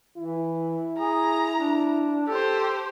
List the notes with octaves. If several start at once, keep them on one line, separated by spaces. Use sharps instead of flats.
E3 E4
G#4 A#5
D4
G4 A4 C5